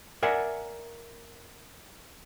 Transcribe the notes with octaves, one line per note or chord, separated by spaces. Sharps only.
A#4 D5 E5 F#5 G#5